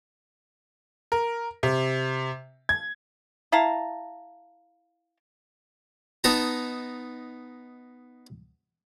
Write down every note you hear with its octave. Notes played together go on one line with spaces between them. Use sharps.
A#4
C3
G#6
E4 F5 A5 A#5
B3 D#4 A5 A#5